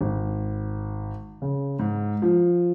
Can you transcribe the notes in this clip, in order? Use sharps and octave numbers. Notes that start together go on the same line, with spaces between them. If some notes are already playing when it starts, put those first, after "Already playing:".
G#1
C#3
G#2
F3